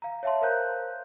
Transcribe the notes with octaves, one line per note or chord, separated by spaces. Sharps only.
F5 A#5
C#5 E5 F5 A5 C6
A#4 C5 F5 A#5 F#6 G6